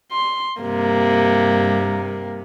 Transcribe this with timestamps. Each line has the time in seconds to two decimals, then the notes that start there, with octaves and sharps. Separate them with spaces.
0.12 C6
0.62 G2 C3 A#3